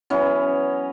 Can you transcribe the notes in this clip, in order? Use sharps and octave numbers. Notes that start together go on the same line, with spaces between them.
E3 F#3 B3 C#4